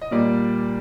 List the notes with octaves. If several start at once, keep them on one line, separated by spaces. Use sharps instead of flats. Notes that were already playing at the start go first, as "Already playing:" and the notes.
D#5
A#2 G3 A#3 D5